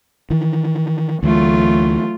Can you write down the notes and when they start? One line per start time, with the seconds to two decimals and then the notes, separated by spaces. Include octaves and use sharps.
0.30 D#3 E3
1.23 D2 E3 F#3 A3 F4